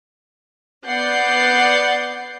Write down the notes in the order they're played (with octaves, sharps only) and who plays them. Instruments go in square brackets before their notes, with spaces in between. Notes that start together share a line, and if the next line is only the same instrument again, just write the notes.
[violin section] B3 D5 F#5 G6 C7